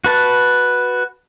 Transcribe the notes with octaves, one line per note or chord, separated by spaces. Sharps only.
F#4 B4 A5